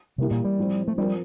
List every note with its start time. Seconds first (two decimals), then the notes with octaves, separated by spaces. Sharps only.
0.18 C3 E3 G3 A#3 E4 G4
0.31 A#2
0.45 G3
0.58 A2 F3 C4
0.88 A3
0.98 F3 G3 C4 F4 A#4